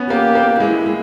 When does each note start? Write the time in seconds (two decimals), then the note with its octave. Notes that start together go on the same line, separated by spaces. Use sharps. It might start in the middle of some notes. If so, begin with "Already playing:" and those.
Already playing: B3 C#4
0.10 A#3 G4
0.35 A#3
0.60 G#3 E4
0.86 G#3